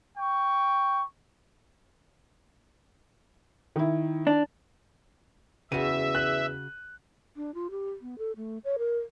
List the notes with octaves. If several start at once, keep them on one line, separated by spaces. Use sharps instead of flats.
G5 C#6
D#3 E4
D4
E2 C#3 F#4 E5 D#7
F#6
D4
F4
G4
B3
A4
A3
C#5
A#4